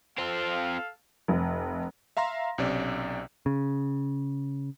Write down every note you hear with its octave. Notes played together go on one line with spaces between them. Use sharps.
C4 F4 A4 F5
F1
E5 F5 A#5 C6 A#6
B1 C3 C#4 D5
C#3